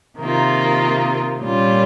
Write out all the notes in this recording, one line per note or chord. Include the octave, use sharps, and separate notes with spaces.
C3 D#3 A#3 F4
A#2 G3 C#4 F4